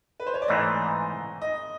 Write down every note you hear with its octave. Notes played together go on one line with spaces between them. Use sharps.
B4
C5
C#5
D5
G#2 E3 A3 C4 D#5
D#5